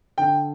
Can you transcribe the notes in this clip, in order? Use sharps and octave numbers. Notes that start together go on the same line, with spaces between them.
D3 G5